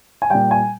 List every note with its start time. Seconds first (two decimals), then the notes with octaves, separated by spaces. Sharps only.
0.22 G#5
0.30 A#2 G3 G5
0.51 G#5